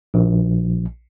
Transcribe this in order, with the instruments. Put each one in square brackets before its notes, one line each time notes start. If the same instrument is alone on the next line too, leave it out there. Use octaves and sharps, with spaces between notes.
[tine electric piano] A#1